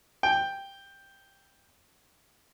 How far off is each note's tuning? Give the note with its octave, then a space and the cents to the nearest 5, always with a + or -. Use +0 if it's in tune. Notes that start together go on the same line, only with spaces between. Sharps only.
G5 +5